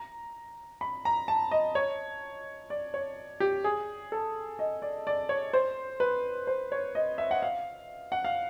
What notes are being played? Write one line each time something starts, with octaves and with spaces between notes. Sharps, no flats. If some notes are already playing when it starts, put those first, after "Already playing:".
Already playing: A#5
B5
A#5
A5
D#5
C#5
D5
C#5
G4
G#4
A4
D#5
D5
D5
C#5
C5
B4
C5
C#5
D#5
E5
F#5
F5
F#5
F5